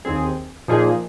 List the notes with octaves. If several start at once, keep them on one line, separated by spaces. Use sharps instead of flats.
D#2 D#3 C4 G#4
A#2 F3 A#3 D#4 G#4